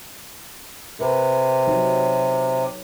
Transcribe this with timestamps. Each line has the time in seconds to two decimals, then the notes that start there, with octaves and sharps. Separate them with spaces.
0.99 C3 A#4 B4
1.67 F#3 D#4